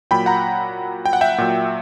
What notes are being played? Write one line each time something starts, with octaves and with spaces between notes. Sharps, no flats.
A#2 F#3 G5 B5
F#5 A#5
G5
F#5
E5 G5
A#2 F#3